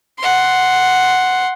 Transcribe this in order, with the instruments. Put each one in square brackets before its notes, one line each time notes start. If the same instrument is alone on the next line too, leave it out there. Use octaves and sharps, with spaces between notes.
[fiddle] F#5 C6